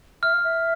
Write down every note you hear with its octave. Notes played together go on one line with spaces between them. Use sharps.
E5 F6
F5
E5